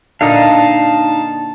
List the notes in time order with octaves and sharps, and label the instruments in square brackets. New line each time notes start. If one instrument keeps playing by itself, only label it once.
[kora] A#2 D3 [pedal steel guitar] D#4 F5 [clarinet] A5